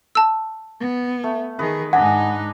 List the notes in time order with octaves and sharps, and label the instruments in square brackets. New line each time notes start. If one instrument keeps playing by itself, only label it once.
[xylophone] A5 E6
[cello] B3
[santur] A3
[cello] D#3 G#4 [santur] B4 D#5
[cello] G#2 D#4 [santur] D4 D#5 G#5 [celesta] F#5